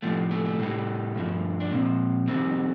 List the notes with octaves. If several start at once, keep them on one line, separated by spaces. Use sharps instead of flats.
A2 F3 A3
A3
A3
A2 G3
G2 F3
D4
A#2 F3 C4
F2 D#3 G3 C4